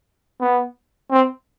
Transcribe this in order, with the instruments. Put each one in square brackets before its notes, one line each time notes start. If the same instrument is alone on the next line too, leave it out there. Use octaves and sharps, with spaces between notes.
[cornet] B3
C4